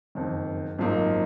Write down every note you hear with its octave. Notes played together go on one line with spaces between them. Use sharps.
F#1 F2 D#3
G#1 F#2 F3 A#3 D#4